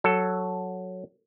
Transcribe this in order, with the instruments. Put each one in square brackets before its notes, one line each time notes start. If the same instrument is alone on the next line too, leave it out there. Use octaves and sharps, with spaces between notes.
[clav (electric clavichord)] F#3 A4